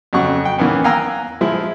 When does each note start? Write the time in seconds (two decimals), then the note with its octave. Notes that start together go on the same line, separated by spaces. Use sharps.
0.13 F2 C#3 F#3 F#5 C#6
0.45 G5
0.59 D#3 E3 A#3 B3 C#4
0.84 F5 G5 G#5 A#5 E6 F#6
1.41 F3 G#3 E4